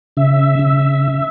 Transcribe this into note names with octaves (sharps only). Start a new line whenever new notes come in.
C#3 E5
C#3